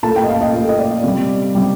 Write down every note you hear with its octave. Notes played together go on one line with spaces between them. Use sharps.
A#2 A3 A5
G5
D#5
F5
D#5
A#2 A3
D#5
D5
C3 G3
C3 G3